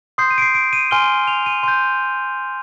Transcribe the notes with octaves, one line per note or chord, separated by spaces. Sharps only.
C6 D#6 G6 C7
D#7
D7
C7
D7
D#7
G#5 C6 F6 G7
F7
D#7
C6 G6